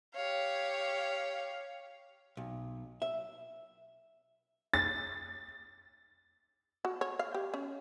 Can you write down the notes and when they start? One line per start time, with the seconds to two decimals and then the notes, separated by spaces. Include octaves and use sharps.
0.15 G4 C#5 F5
2.37 B1
3.02 E5
4.74 A6
6.85 F#4
7.01 C#5
7.19 F5
7.34 G4
7.54 C#4